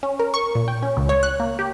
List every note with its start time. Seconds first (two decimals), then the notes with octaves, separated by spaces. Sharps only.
0.03 C#4
0.19 A#4
0.34 C#6
0.55 A#2
0.68 G5
0.82 C#4
0.97 C#2
1.09 C#5
1.23 F#6
1.40 A#3
1.59 G4